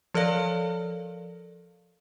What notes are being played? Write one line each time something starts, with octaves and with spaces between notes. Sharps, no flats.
F3 A4 A#4 D5 F5